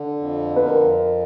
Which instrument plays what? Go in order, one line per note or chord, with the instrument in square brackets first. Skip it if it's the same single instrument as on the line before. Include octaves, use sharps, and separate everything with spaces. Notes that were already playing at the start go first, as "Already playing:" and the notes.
Already playing: [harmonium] D3
F2
[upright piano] B4
[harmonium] F2 [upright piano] A#4